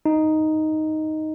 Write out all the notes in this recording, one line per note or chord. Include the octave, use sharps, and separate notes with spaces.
D#4